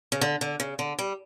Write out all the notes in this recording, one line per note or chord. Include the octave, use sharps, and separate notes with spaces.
C#3
D3
D3
C#3
D3
G3